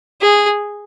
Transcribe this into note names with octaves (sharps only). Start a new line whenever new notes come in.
G#4